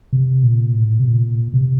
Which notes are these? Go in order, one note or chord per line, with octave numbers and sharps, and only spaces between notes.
C3
A#2
A2
C3
A#2
C3